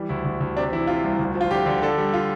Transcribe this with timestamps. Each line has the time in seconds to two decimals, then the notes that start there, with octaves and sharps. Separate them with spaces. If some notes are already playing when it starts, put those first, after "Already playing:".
Already playing: E3 G3
0.09 D2 E4
0.25 D2
0.40 D2
0.57 C3 D4
0.72 E3 E4
0.87 C3 F4
1.04 C2
1.19 D2
1.35 F3
1.41 F4
1.51 D3 G4
1.66 D3
1.82 D3 A4
1.98 G3
2.14 F4